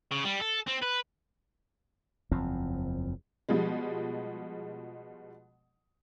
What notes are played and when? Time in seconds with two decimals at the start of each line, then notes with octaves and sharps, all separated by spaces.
0.12 C#3
0.25 G3
0.42 A4
0.68 C4
0.83 B4
2.32 F#1 E2 F3 C4
3.49 B2 F3 G3 G#3